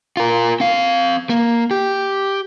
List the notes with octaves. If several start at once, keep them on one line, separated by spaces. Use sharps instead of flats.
F4 A#4
C4 F5
A#3
G4